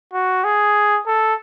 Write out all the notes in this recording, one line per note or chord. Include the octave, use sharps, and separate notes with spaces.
F#4
G#4
A4